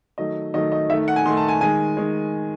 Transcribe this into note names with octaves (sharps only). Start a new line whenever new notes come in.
D#3 F#3 A3 D#5
D#3 F#3 A3 D#5
D#5
D#3 A3 E5
F#5
G#5
D#3 A3 C6
A5
G#5
D#3 G#3 G#5
D#3 G#3